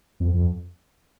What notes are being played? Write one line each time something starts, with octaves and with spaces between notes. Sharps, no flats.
F2
F2